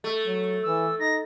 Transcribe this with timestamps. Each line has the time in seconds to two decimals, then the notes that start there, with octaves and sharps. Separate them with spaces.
0.04 A3
0.24 F#3
0.63 E3 E6
1.00 D#4 A#6